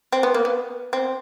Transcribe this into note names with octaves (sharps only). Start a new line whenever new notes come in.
C4
B3
A#3
B3
C4